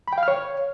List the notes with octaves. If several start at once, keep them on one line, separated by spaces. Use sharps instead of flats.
B5
G5
F5
F6
C#5